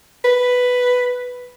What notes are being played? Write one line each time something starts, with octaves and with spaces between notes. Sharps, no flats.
B4